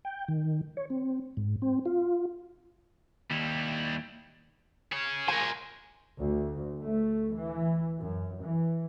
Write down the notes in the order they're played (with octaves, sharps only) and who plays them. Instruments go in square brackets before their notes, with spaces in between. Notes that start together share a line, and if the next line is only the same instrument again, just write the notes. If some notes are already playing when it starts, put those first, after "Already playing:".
[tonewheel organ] G5
D#3
C#5
C4
G#2
C4
F4
[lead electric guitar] D#2 [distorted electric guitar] G3 E4
[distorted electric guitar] G#4 C#5
[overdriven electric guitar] A#4 C5 [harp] G#5
[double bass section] D2
A3
E3
F#2
E3